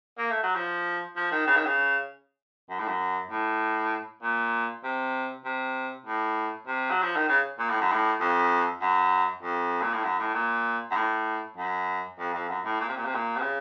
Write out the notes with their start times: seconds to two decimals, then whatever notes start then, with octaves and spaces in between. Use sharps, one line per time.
0.18 A#3
0.31 A3
0.43 F#3
0.55 F3
1.17 F3
1.32 D#3
1.47 C#3
1.56 D#3
1.66 C#3
2.70 F#2
2.79 A2
2.88 F#2
3.31 A2
4.23 A#2
4.84 C3
5.45 C3
6.06 A2
6.67 C3
6.91 F#3
7.03 F3
7.16 D#3
7.29 C#3
7.59 A#2
7.70 A2
7.81 F#2
7.92 A2
8.21 F2
8.82 F#2
9.43 F2
9.82 A#2
9.93 A2
10.04 F#2
10.19 A2
10.34 A#2
10.91 F#2
10.96 A2
11.57 F#2
12.19 F2
12.34 F2
12.49 F#2
12.65 A2
12.80 A#2
12.89 C3
12.97 A#2
13.05 C3
13.15 A#2
13.37 C3
13.41 C#3